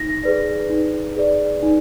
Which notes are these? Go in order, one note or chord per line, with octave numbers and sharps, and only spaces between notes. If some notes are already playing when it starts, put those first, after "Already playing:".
Already playing: D#4 A#6
G#4 B4 D5
D#4
G#4 B4 D5
D#4